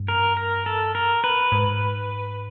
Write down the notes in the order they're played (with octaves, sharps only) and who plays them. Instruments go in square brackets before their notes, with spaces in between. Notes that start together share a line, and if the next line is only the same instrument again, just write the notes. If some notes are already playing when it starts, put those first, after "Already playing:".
Already playing: [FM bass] G2
[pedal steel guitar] A#4
A#4
A4
A#4
B4
[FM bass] G#2